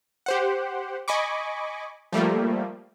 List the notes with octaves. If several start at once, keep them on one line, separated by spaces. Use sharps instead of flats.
G4 C5 F#5
D#5 G#5 B5 C#6 D6
F3 G3 A3 A#3